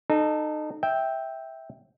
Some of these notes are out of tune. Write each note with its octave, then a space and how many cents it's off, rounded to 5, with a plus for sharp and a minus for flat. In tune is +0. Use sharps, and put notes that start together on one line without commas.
D#4 -25 A4 -5
E5 -10 G5 +0